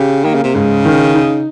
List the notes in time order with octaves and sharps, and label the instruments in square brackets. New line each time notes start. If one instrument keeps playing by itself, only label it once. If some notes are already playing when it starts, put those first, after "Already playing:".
Already playing: [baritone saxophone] C#3 [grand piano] G4
[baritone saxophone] D#3 [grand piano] A#3
[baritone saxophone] C#3
C3
[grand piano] G#2 [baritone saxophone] C#3
[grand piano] D#3
D#4